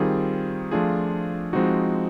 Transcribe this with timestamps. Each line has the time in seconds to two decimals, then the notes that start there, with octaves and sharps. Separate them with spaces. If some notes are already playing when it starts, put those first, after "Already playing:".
Already playing: D#3 G3 C4 F4 G#4
0.71 F3 A3 D4 F4 G#4
1.53 F3 G#3 C4 D#4 F#4